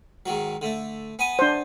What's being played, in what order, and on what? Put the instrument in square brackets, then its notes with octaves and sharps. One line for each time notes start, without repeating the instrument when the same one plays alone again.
[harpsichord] G#2 D#3 F#3
D3 A3
B3 G#5 D#6
[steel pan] D4 C5